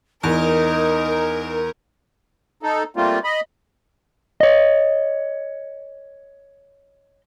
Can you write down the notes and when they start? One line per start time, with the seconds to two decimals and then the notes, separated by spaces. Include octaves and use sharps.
0.23 E2 D#4 A#4
2.63 D#4 A4
2.96 G3 A3 A#3 C4 F4
3.24 D#5 B5
4.41 C#5 D#5